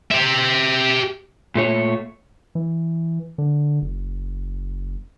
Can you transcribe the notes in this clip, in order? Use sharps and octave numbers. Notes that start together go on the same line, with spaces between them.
G4 E5
A#2 A3 C#5
E3
D3
F#1